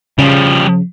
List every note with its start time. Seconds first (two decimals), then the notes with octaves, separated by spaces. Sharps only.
0.19 C#3 F3 G3